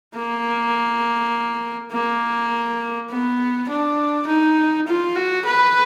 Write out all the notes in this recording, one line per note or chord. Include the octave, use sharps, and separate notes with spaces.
A#3
A#3
B3
D4
D#4
F4
F#4
B4